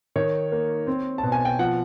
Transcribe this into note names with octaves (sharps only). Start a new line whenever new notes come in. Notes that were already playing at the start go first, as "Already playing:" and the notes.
D#3 C#5
A#3
C4
B2 A5
G#5
G5
F3 F#5